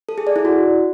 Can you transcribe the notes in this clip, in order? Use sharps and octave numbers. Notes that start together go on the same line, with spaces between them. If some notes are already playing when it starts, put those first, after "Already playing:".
A4
G#4
D5
E4
F#4